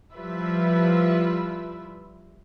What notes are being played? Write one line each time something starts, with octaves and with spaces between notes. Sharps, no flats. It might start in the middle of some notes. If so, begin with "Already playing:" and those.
F3 G3 E4 F4 B4 E5